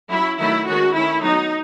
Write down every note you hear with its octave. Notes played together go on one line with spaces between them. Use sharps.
F#3 C#4 E4
D#3 F#3 A3 E4
D#3 G#3 C#4 F#4
D#3 A3 C#4 E4
F#3 B3 D#4